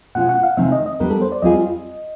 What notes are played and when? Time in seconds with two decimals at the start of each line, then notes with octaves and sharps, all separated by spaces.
0.15 B2 G#3 C#4 F4 F#5
0.29 F#5
0.43 F5
0.57 C3 D#3 G#3 C4 D#4 E5
0.72 D#5
0.86 D#5
1.00 G3 B3 D4 A#4
1.10 A4
1.22 C5
1.32 D5
1.42 G3 C4 F4 G#4 D#5